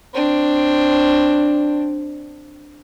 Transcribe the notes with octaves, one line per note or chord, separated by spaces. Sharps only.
C4 D4